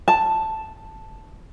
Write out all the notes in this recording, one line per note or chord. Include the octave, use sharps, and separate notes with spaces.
A5